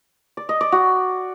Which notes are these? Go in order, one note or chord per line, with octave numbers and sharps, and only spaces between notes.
D5
D#5
D5
F#4